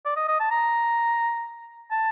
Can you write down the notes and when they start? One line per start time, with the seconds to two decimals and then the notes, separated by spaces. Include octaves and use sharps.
0.05 D5
0.16 D#5
0.28 D#5
0.40 A5
0.51 A#5
1.91 A5